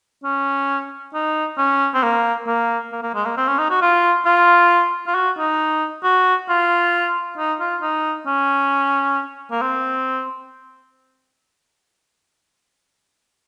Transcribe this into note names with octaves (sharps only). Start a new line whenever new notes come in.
C#4
D#4
C#4
C4
A#3
A#3
A#3
A#3
G#3
A#3
C4
C#4
D#4
F#4
F4
F4
F4
F#4
D#4
F#4
F4
D#4
F4
D#4
C#4
A#3
C4